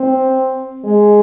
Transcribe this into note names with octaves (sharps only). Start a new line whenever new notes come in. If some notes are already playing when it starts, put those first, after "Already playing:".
Already playing: C4
G#3